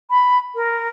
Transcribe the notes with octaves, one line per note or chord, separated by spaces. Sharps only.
B5
A#4